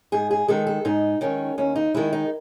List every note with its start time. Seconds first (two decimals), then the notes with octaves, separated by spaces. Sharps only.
0.12 G#2 G#4
0.31 G#4
0.48 D#3 G#3 A4
0.67 A4
0.85 G#2 D#4
1.21 D#3 G#3 C#4
1.58 D#2 C#4
1.76 D#4
1.94 D#3 G#3 E4
2.13 D#4